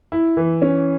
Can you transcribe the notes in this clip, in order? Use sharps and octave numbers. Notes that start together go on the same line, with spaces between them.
E4
E3
C#4